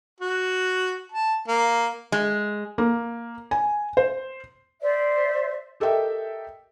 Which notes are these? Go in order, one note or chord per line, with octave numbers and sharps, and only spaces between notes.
F#4
A5
A#3
G#3
A#3
G#5
C5
C5 D5 E5
G4 A4 A#4 D#5 E5 G5